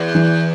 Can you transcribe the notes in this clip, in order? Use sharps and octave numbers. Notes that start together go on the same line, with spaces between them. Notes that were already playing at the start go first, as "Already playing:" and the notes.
Already playing: E2
E3